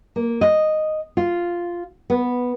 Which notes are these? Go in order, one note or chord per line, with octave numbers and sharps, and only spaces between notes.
A#3
D#5
F4
B3